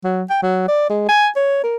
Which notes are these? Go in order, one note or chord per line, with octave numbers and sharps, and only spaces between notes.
F#3
G5
F#3
D5
G#3
G#5
C#5
A#4